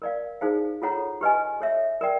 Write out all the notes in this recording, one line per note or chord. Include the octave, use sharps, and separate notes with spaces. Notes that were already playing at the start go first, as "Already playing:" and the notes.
A#4 D5 F5
D#4 G#4 C5 F5
F4 A4 C#5 F#5 A#5
G4 B4 D#5 G#5
A4 C#5 E5
A#4 D5 G5